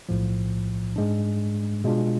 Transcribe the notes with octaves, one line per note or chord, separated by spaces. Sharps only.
B1 A2 F3
G#2 G#3 D4
B2 G#3 D4 F4